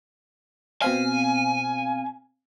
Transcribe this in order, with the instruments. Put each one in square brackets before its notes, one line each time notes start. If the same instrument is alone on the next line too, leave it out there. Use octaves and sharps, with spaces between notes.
[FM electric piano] B2 C4 F5 [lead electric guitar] G#5